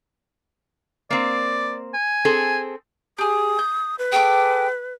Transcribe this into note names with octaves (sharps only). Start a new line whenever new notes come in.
A#3 C4 D5
G#5
C4 G#4 A4
G4 G#4 D#6
G6
B4
G#4 A4 G5 D6